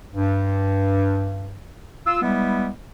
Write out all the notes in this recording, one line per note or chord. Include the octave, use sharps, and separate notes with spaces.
G2
F4 E6
G3 G#3 B3 E4